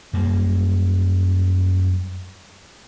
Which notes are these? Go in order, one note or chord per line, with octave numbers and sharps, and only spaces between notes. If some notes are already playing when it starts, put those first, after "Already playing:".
F#2 G3 A#3